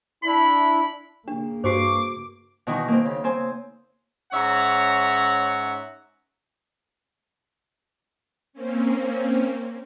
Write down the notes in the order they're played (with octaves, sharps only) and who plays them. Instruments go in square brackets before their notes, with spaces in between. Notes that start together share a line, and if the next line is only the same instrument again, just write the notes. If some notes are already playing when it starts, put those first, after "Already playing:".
[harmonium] D4 E4 [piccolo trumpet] B5
[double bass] C#3 A#3 [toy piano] D4
[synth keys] G2 C#6 C7 [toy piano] F#4 C5 [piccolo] D6
[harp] B2 D#3 E3
A#3 C4
C#3
C4 C5 G#5
[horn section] G#2 C#4 C#5 E5 F#5 A#5
[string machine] A#3 C4 C#4